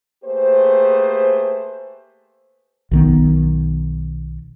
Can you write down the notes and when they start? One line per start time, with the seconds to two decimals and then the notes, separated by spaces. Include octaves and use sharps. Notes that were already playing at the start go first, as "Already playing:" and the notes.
0.25 A3 A#3 G4 G#4 B4 C5
2.91 B1 D#3 B3